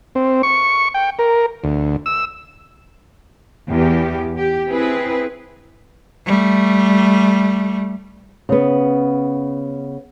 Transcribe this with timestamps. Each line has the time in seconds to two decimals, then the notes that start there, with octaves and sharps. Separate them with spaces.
0.15 C4
0.43 C#6
0.94 G5
1.19 A#4
1.64 D2
2.06 E6
3.69 E2 G4
4.37 G4
4.68 C4 E4 G#4 B4
6.25 G3 A3
8.49 C#3 B3